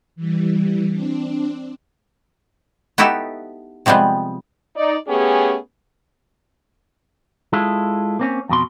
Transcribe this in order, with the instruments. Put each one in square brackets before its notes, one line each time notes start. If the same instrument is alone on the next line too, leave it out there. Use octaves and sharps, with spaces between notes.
[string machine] E3 G3
C4 D4
[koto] B3 D#4 E4 F#4 G4 A4
C3 F3 G3 G#3 B3
[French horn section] D#4 D5
A3 B3 C#4 G4 G#4
[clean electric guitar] G#3 E4 F4 A4
A#3 C4 C#4
F2 B2 C6